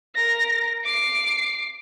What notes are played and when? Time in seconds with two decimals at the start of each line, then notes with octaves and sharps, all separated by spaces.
0.16 A#4 A#6
0.84 D6 C7